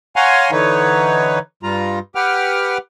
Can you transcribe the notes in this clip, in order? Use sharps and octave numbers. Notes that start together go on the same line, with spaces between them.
C#5 F5 F#5 G#5 A#5 C6
D3 E3 D#4 B4 C#5
G2 G3 F4 A#5
G4 B4 F#5 G5 F6